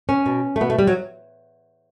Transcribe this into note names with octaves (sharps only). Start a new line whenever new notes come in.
C#4
B2
A3
B2 B3
A3
G3
F#3